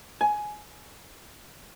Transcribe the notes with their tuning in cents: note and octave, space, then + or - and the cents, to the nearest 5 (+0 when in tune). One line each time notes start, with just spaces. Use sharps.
G#5 +15